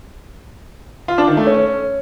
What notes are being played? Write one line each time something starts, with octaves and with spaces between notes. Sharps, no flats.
F4
D4
D#3
A3
C#4